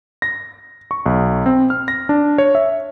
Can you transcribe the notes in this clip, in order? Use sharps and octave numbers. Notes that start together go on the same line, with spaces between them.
A#6
C#6
B1
C4
F6
A#6
D4
C#5
E5